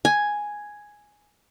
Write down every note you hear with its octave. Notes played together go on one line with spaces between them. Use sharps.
G#5